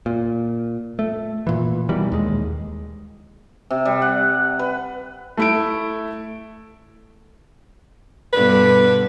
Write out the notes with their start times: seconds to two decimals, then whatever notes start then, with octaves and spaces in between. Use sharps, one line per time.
0.06 A#2
0.99 A3
1.47 A#2 E3
1.89 B2 D#3 E3 G3
2.12 D#2 G#3
3.70 C3
3.85 G3
4.02 F#5
4.59 B4
5.37 A3 E4 D7
8.33 G2 B2 D3 B4